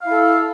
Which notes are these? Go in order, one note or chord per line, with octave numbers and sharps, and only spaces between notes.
E4 A4 F5